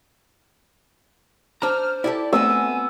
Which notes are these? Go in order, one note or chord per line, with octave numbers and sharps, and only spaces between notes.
D4 C5 A#5 F6
E4 G4 A4 D5
A3 B3 C4 F#4 G#5 E6
G#5